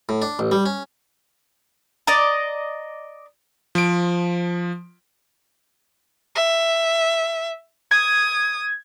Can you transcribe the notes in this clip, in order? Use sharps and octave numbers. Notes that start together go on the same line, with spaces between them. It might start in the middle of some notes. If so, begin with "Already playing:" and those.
A2
D4
A1
G3
C#4
D5 D#5 A#5
F3 D7
E5
D#6 G#6